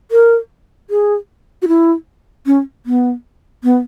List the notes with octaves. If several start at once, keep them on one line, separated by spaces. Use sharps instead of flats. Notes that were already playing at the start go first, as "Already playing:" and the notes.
A#4
G#4
F#4
E4
C#4
B3
B3